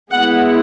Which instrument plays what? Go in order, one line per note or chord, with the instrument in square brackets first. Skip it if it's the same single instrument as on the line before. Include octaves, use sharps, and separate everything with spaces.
[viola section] G#3 B3 E4 F#5